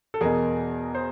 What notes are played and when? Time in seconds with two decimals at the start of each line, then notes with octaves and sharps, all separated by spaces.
0.14 A4
0.21 E2 B2 G#4 A#4
0.95 C5